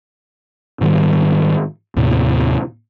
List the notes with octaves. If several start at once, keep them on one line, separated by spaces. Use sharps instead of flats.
G#2 D#3 G3
D#2 A2 C3